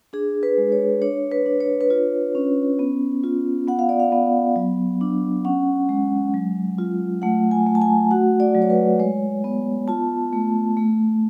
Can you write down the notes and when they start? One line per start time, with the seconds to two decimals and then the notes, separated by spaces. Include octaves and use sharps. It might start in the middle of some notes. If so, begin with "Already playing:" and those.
0.13 D4 G#4
0.43 B4
0.58 G#3
0.72 C#5
1.02 D4 C#5
1.32 B4
1.46 D4
1.61 C#5
1.81 B4
1.90 F4 C#5
2.35 C#4
2.79 B3
3.24 F4
3.68 B3 F#5
3.79 F5
3.89 D5
4.00 F5
4.12 B3
4.56 F#3
5.01 D4
5.45 C#4 F#5
5.89 G#3
6.34 F#3
6.78 F4
7.22 A3 F#5
7.51 G#5
7.67 A3
7.75 A5
7.82 G#5
8.11 F#4 F#5
8.40 D5
8.55 F#3
8.62 C#5
8.70 B4
9.00 G#3 C#5
9.44 B3
9.88 F4 A5
10.33 A3
10.77 A3